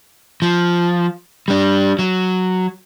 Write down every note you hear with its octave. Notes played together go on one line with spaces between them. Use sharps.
F3
G3 D4
F#3